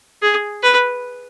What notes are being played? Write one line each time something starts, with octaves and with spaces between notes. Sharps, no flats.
G#4
B4